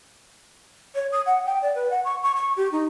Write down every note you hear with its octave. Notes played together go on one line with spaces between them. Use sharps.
C#5
D#6
F#5
G5
D5
B4
F#5
C#6
C#6
C#6
G4
D#4